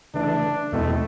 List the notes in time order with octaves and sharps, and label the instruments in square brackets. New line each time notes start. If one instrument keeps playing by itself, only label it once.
[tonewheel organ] C#3 E3 A3 [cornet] D4
[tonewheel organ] E2 B2 G#3 C4 E4 [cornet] A3